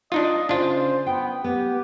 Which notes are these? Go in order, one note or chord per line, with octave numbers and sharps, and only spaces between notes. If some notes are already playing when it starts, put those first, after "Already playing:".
D4 D#4 F4 D#5
C#3 D4 F4 C5
B3 G5
B3 G4